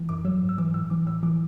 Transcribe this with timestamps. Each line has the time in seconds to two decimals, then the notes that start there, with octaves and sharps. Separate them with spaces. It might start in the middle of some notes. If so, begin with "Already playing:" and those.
Already playing: E3
0.09 F#2 D6
0.25 F#3 E6
0.42 G#2
0.49 E6
0.58 E3 D6
0.74 A2 E6
0.90 E3 D6
1.07 A2 E6
1.23 E3 D6